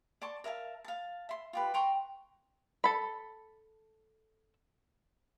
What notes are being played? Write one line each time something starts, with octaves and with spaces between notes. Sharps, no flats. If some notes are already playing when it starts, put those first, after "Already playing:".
D5 A5 C6 C#6
A#4 E5 F5 A5
F5 A5
E5 C6
F4 G4 B4
G5 A#5 C6 C#6
A4 B5